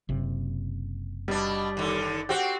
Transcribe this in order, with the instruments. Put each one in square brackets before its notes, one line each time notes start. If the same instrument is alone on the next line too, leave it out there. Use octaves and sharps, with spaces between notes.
[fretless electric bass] F#1 C3
[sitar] B2 D4 [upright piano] G3
[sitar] D#2 D3
[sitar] C4 F#4 [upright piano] G4 F#5